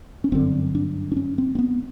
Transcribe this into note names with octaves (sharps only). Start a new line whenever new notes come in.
C#4
G1 F#2 D3 C4
D4
D4
C#4
C4
C4
B3